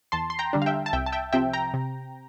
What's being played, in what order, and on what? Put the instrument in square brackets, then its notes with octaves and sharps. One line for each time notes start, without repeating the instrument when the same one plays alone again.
[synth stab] E2 A5 C6
C6
G5 A#5
D3 G3 D4
F5
E5 G5
A5
C2 E5 G5
A5
E5 G5
C3 F3 C4 E5 G5
G5 A#5
C3